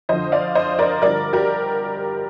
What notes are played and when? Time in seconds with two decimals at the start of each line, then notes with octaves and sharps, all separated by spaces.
0.09 F2 D3 F3 C5 D#5
0.32 D5 F5
0.55 C5 D#5
0.79 A#4 D5
1.02 G2 D3 F3 A#4 D5
1.33 G4 A#4